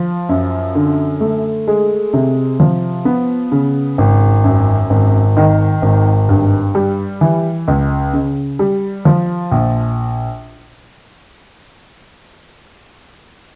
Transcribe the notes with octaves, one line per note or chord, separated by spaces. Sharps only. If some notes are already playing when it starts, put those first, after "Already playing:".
Already playing: F3
F#2
D3
A3
G#3
C3
F3
B3
C#3
G#1
F#2
G#1
D#3
G#1
G2
G3
E3
C#2
C#3
G3
F3
A#1